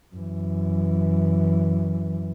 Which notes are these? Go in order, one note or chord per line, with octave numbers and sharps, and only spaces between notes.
F#2 E3